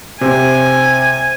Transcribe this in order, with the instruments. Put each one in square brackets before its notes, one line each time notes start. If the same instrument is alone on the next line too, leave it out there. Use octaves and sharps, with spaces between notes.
[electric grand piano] C3 [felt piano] C5 [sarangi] G#5